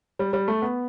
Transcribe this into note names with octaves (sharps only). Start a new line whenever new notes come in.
G3
G3
A3
B3